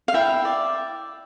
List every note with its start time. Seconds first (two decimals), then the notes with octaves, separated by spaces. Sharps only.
0.08 F5
0.14 E4 E5 G5
0.45 D5